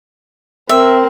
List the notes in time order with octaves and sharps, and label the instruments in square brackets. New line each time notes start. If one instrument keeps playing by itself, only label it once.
[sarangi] C4 [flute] A#4 [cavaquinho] E5